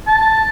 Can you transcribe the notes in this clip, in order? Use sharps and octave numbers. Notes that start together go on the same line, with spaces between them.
A5